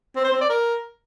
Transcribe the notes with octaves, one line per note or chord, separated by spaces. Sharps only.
C4
C5
C4
D5
A#4